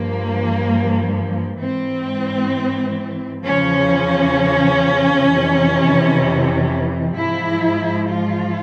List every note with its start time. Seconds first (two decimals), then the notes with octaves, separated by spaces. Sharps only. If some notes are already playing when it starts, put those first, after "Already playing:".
Already playing: G2 F3 A#3
1.59 G#2 E3 C4
3.44 E2 C#3 F3 C#4
5.30 F2 C3 E3
7.15 G#2 F3 E4
8.08 F4